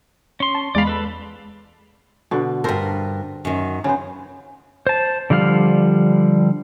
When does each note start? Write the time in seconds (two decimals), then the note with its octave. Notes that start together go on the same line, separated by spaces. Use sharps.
0.40 C#4 C6
0.55 A5
0.75 E2 G#3 D5 F5 B5
0.87 A4 B4
2.31 B2 D3
2.64 G2 A4 A#4 C5
3.45 F#2 D#3
3.84 C#3 B3 C5
4.87 C5 A5
5.30 D3 F3 G3 F5 F6